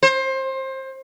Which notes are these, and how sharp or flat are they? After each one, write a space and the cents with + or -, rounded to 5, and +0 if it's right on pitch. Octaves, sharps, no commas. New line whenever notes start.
C5 +25